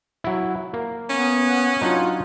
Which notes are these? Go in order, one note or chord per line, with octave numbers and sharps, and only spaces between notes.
F#3 E4
A#3
B3 C#4
F#3 D4 D#4 F4